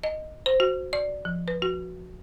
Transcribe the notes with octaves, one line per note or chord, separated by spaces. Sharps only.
D#5
C5
F#4
D5
F3
B4
F#4